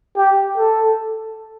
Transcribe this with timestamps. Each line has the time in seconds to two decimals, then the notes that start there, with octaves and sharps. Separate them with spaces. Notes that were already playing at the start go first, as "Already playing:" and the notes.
0.17 G4
0.57 A4